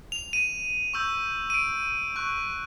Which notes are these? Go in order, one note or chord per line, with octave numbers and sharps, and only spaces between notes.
F7
D#7
C#6 E6 G6
D#7
D7
C#6 F#6